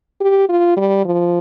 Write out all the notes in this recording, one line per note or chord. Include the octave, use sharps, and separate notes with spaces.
G4
F4
G3
F3